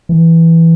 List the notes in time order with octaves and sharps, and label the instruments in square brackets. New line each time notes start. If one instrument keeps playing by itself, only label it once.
[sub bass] E3